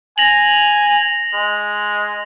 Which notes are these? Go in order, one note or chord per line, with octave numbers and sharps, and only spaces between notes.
G#5 A#6 F7 F#7
G#3